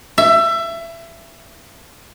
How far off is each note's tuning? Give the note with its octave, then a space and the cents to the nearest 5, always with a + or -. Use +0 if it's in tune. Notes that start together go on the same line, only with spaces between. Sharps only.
E5 +25